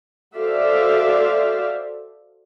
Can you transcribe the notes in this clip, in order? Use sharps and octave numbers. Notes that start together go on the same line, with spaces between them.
F#4 A4 C5 D5 E5 F5